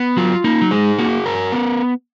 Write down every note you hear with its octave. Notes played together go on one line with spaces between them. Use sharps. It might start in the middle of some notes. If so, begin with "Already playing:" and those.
Already playing: B3
F#3 F4
A#3 D#4
F#3
G#3 G#4
A#3 F#4
A#4
B3